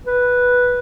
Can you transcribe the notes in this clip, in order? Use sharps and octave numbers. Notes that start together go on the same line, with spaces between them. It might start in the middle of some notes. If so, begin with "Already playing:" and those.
B4